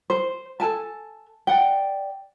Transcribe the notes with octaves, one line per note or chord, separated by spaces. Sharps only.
C5
A4 G#5 A5
D5 F#5 G5